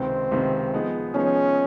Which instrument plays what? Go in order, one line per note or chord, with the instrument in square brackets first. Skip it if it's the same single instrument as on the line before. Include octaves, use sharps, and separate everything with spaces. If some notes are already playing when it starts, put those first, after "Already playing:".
Already playing: [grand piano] C#2 C3 D#3 [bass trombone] C4
[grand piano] C#2 C3 D#3
F3 G#3 B3 D#4 G#4
[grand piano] F3 G#3 B3 D#4 G#4 [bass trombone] C#4